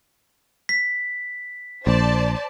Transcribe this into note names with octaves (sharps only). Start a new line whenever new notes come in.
B6
A#1 C5 D5 A5